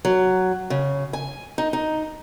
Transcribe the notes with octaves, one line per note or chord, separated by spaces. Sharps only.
F#3
C#3
G#5
D#4
D#4